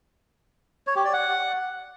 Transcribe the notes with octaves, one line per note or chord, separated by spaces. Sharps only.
C#5
G4
D5
F#5